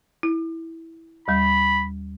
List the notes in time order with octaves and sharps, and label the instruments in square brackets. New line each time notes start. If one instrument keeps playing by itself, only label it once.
[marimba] E4
[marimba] D#2 G3 [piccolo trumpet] B5